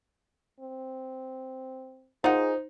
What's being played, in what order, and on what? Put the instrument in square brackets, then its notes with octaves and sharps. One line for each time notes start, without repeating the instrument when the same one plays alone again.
[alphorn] C4
[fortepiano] D#4 [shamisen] F4 A#4 F#5 [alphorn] G#4 [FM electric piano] C5